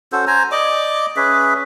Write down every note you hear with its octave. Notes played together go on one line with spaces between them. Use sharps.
C#4 F#4 A4 C5
C5 G#5 A#5
D5 D#5 D6
C#4 G#4 B4 E5